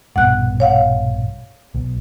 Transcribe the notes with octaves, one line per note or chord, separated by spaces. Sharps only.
A#1 G2 B2 F#5 F#6
C#5 F5 F#5
B1